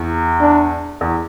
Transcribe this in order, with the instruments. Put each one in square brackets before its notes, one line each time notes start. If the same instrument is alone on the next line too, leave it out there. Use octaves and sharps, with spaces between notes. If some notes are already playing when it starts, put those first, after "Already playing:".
Already playing: [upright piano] E2
[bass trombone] D4
[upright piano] E2